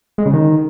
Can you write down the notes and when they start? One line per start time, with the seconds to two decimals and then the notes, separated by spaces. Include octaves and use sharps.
0.18 G#3
0.26 C#3
0.33 D#3